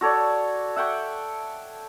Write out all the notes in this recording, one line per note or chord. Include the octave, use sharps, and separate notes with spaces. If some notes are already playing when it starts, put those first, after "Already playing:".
F#4 A4 C#5 D5
E5 F#5 G5 C#6